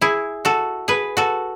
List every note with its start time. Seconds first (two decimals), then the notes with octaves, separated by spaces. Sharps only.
0.01 E4 G#4
0.45 F#4 A4
0.88 G#4 B4
1.17 F#4 A4